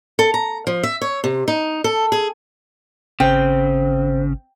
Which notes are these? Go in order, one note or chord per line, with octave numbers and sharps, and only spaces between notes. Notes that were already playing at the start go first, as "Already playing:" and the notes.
A4
A#5
F3
E5
C#5
C3
D#4
A4
G#4
G#1 C#3 C4 G5